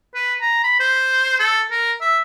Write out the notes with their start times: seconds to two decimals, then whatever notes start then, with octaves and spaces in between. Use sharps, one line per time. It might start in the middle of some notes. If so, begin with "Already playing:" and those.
0.15 B4
0.41 A#5
0.64 B5
0.80 C5
1.40 A4
1.71 A#4
2.01 E5